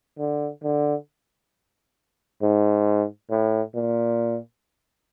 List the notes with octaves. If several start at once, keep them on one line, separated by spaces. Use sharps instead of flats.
D3
D3
G#2
A2
A#2